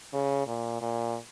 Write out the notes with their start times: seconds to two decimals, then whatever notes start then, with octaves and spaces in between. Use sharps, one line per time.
0.13 C#3
0.47 A#2
0.81 A#2